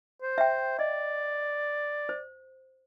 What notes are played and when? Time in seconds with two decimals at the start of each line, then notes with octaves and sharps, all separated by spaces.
0.22 C5
0.38 E5 G5
0.79 D5 D#5
2.09 C5